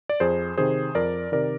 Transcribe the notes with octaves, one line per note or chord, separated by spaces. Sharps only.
D5
F2 G#4 C5
C3 D#3 G#4 C5
F2 A#4 D5
C3 D#3 A#4 D5